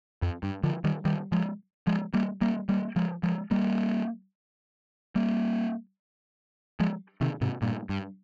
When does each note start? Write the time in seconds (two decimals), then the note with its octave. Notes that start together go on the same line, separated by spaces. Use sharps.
0.22 F2
0.43 G2
0.64 D3 F3
0.84 D#3 G3
1.05 D#3 G3
1.32 F3 G#3
1.87 F3 G#3
2.14 G3 A#3
2.41 G3 A#3
2.69 G3 A#3
2.96 F3 G#3
3.23 F3 G#3
3.51 G3 A#3
5.15 G3 A#3
6.80 F3 G#3
7.21 C3 D#3
7.41 G#2 C3
7.62 G2 A#2
7.89 G2